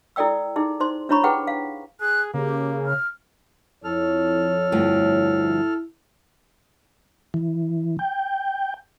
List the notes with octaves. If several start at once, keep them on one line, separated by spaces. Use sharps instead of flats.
E4 A4 D5 G5 E6
D#4 E4 G#4
D#4 C5 C6
D4 E4 C#5 A#5 B5 C#6
E4 G4 G#4 B4 F#5 G5
F5
G#4 F#6
C#3 A#3 G4
F6
F2 E4 A4 C#5 F6
D2 G2 F3 E4
E3
G5